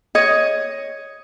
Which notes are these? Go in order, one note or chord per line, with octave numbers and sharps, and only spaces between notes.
C#5 D#5